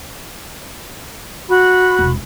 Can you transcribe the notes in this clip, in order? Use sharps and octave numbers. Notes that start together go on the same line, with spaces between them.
F#4 B5
E1 C2